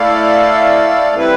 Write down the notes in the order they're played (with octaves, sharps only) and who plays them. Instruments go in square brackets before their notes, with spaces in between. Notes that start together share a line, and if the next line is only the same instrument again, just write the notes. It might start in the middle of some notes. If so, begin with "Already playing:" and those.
Already playing: [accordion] A3 E4 A4 D5 F5
C3 G3 C4 E4 B4